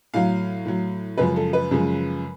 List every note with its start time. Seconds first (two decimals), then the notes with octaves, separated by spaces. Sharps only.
0.14 A2 F#3 F5
0.65 A2 F#3
1.17 F#2 C#3 F3 G#3 B4
1.36 A4
1.53 B4
1.71 F#2 C#3 F3 G#3